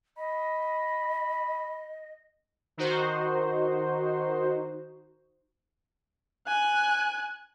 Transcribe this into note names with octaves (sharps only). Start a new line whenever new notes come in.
D#5 B5
D#3 D#4 F#4 C5
G#5 F#6